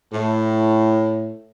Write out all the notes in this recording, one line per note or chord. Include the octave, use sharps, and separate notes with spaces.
A2